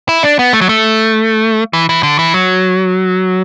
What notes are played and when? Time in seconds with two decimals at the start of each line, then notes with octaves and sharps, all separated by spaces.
0.09 E4
0.23 D4
0.39 B3
0.53 A3
0.61 F#3
0.69 A3
1.73 E3
1.89 E3
2.03 D3
2.19 E3
2.34 F#3